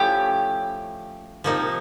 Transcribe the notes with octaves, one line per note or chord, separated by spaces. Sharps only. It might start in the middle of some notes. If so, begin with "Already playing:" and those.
Already playing: F3 A3 C#4 E4 G4
C3 F3 A#3 D#4